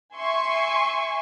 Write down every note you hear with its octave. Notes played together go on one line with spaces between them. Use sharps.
E5 G#5 C6 C#6